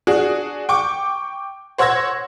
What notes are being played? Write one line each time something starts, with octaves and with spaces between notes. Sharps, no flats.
D4 F#4 G#4
G5 C#6 D6
C5 C#5 F#5 E6 G#6 A#6